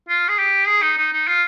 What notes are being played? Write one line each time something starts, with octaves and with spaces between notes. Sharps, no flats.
F4
G#4
G4
G#4
D#4
D#4
D#4
F4